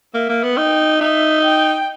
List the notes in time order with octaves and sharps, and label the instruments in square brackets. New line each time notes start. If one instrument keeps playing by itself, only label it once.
[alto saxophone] A#3 [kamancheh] E5
[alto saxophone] A#3
B3
[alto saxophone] D#4 [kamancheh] G5
[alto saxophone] D#4 [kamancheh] E5
[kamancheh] G5